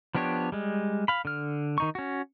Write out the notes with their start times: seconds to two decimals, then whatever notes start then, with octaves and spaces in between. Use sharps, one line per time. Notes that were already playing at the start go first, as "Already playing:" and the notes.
0.15 F3 B3 D4 G4 C#5
0.52 G3 G#3
1.08 F5 B5
1.25 D3 F6
1.78 D#3 D#4 C#6
1.95 C#4 F#4